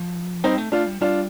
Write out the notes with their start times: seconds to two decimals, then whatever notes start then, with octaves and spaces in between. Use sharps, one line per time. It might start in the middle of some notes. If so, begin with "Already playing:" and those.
Already playing: F3
0.44 G3 C4 D#4
0.58 A3
0.72 A3 D4 F4
0.86 G3
1.01 G3 D4 F4